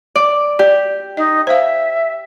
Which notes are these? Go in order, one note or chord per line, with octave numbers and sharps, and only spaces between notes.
D5
G4 D5
D#4 D#5
C5 E5 F5